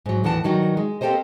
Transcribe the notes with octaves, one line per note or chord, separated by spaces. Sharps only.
G#2 F#3
D#2 A2 E3 F#5 A5
G2 D#3 F#3 D#4 F#4
G#3
A#3 C4 G4 A4 C5 D#5